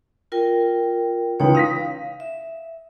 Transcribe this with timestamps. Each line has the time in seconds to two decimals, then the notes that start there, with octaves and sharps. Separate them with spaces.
0.32 F4 A#4 G5
1.40 C#2 E3 D#4 C#5 G5
1.55 F5 D#6 A#6 B6
2.20 E5